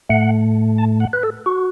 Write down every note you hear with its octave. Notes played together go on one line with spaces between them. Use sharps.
A2 A3 F#5
A5
F#5
B4
A4
F#4